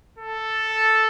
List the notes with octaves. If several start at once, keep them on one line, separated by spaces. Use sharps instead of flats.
A4